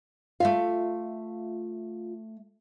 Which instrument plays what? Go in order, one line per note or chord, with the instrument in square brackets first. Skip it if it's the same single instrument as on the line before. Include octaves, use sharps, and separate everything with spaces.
[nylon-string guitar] A3 E5 F5 [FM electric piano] F4